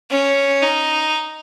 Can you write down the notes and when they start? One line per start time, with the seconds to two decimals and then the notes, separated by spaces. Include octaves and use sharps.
0.11 C#4
0.63 D#4